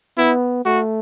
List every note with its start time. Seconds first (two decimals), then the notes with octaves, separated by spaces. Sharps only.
0.18 B3 E4
0.65 A3 F#4